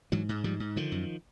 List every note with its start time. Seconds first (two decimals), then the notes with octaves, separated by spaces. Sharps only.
0.12 G#2 E3 F#3
0.29 G#2
0.44 G#2 F3 G3
0.60 G#2
0.76 D3 D#3 F3
0.92 F#2